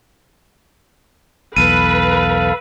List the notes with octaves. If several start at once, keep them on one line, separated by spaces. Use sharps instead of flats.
B1 E2 A4 B4 F5 D#7